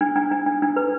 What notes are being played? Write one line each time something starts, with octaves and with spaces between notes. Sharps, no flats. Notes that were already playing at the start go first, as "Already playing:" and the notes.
D4
D4
D4
D4
D4
B4